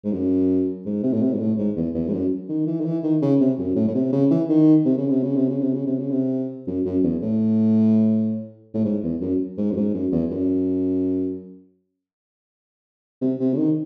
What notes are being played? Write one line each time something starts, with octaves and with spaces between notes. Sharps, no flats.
G#2
F#2
G#2
C3
A2
C3
G#2
A2
G#2
E2
E2
G#2
F#2
D#3
E3
D#3
E3
D#3
C#3
C3
F#2
A2
A2
C3
C#3
E3
D#3
C3
C#3
C3
C#3
C3
C#3
C3
C#3
C3
C#3
C3
F#2
F#2
E2
A2
A2
G#2
E2
F#2
G#2
F#2
G#2
F#2
E2
F#2
C3
C3
C#3
D#3